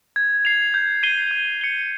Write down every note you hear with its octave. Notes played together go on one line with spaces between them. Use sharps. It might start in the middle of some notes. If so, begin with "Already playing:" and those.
G#6
C7 F7
G6
C7 D#7 G7
G6
C#7 G7